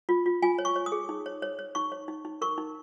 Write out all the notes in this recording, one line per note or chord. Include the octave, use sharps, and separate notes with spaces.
F4
F4
F4 G#5
C#5
C#6
C#5
D#6
G#4
D#4
C#5
C#5
C#5
D#4 C#6
C#5
D#4
D#4
A#4 C#6
D#4